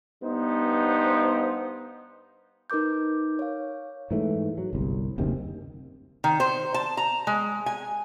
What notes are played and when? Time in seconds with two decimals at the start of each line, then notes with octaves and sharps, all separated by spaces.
0.23 G2 B3 D#4 C5
2.70 D#4 A#4 B4 D6 G6
3.39 C#5 F5
4.11 G#2 E3 A3
4.58 F#3
4.73 G1 C2
5.18 F#1 D2 C3 D#3
6.24 D#3
6.40 C5
6.74 A5
6.97 A#5
7.27 G#3
7.66 G#5